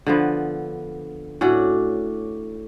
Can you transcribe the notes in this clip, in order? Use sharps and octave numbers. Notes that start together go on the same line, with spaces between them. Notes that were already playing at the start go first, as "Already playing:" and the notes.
D3 F3 B3
A2 C#4 D4 F#4